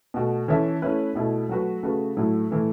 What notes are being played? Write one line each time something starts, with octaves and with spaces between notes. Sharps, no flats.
B2 A3 F#4
E3 C#4 A4 E5
A3 C#4 E4 B4
B2 A3 E4
F#3 A3 F#4 B4
C#3 A3 F#4 B4
A2 F#3 A3 E4
A2 E3 A3